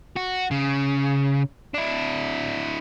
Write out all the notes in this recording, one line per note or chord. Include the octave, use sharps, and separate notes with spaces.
F#4
C#3
D4 E4